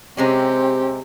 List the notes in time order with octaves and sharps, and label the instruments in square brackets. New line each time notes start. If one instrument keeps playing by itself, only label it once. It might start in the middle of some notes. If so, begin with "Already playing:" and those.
[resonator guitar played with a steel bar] C3 G#3 C#4 [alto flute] C4 [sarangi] G4